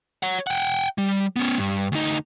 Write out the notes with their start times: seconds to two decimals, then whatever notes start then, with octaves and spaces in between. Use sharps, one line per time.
0.23 C#5 F#5
0.47 F#5 G5
0.98 G3
1.36 B3 C#4
1.59 G2
1.92 D2 D#4